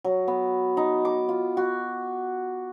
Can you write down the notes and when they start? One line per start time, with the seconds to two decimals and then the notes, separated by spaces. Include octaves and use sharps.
0.04 F#3
0.28 B3
0.77 D#4
1.05 D6
1.29 F4
1.57 F#4